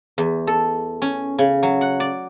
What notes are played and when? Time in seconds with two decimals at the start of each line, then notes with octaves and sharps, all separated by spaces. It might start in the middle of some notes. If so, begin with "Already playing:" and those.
0.18 E2
0.47 A4
1.02 C#4
1.38 C#3
1.63 F#3
1.81 F#5
2.00 D5